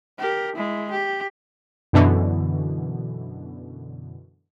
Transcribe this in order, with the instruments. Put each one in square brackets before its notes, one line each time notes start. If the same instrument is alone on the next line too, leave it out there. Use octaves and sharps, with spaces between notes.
[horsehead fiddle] G4 A#4
G#3 E4
G4
[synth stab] F#2 B2 D3 E3